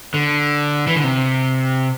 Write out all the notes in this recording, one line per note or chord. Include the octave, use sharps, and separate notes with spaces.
D3
E3
D3
C3